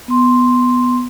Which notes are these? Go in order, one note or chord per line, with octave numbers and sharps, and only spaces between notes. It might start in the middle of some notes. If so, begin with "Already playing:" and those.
B3 C6